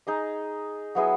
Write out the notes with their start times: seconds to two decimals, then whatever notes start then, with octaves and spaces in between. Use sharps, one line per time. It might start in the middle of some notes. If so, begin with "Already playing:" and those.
0.07 D#4 G#4 D#5
0.95 F#3 B3 E4 G#4